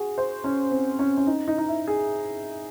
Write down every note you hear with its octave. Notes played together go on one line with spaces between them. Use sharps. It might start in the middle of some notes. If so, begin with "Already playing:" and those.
Already playing: F#4 G#4
C5
C#4
C4
C#4
C#4
D#4
D#4
D#4
E4
G#4